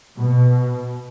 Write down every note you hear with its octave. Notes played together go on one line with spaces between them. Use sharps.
B2